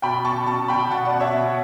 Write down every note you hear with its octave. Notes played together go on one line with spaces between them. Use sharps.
B2 G5 B5
B2 A5 C#6
B2 A5 C#6
B2 G5 B5
B2 F#5 A5
D5 F#5
B2
C#5 E5
B2